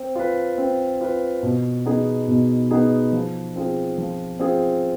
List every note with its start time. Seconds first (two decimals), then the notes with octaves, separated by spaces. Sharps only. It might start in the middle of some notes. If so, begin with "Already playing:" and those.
Already playing: C4
0.16 F4 B4
0.58 C4
1.01 F4 B4
1.43 B2
1.86 B3 D#4 G#4
2.28 B2
2.71 B3 D#4 G#4
3.12 F3
3.56 C4 F4 G#4
3.98 F3
4.40 C4 F4 G#4